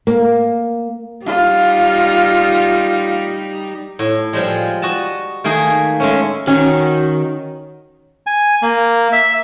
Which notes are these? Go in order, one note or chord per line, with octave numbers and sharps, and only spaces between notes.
A#3
G3 D#4 F4
A2
F3 G3 G#3
F#4 D#5 A5
D#3 A3 A#3 G#4
G#3 A3 C#4
D#3 C#4 F#4
G#5
A#3
E5